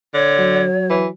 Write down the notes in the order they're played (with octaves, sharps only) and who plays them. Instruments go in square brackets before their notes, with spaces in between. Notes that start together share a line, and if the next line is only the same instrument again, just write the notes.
[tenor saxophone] D3 [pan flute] C#5
[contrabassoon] F#3
[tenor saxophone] E3